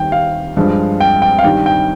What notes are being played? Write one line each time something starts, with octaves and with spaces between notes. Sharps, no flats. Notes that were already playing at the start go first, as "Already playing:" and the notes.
Already playing: D#2 D#3 G3 G5
F5
G2 F3 G#3
G5
G5
F5
G2 D#3 G3 G5
G5